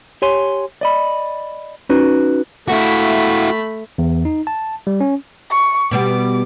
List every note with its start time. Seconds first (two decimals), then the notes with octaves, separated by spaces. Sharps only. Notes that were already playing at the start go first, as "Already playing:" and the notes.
0.22 G4 C#5 G#5 C6
0.81 D5 D#5 B5
1.89 C#4 D#4 F#4 B4
2.68 A3 E4 F#4 B5
3.98 E2
4.25 D#4
4.47 A5
4.87 G3
5.01 C#4
5.51 C#6
5.91 B2 G3 B3 D6